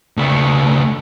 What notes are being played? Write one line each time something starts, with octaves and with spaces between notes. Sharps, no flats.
C#2 A3